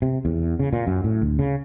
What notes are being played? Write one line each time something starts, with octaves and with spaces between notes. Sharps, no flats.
C3
E2
C#3
A#2
F#2
A2
D2
C#3